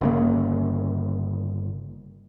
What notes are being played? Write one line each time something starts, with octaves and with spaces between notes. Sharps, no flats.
G1 C#3 A#3